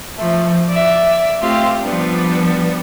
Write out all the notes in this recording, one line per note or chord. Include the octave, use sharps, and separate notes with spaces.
F3 A3
D5 E5
A3 C4 F4 G4
F3 G3 B3 D4